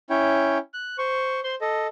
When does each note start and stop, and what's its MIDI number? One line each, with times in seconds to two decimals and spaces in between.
0.10 0.58 61
0.10 0.58 64
0.10 0.58 73
0.10 0.58 79
0.74 0.97 90
0.98 1.40 72
0.98 1.40 85
1.44 1.55 72
1.44 1.55 84
1.61 1.87 69
1.61 1.87 75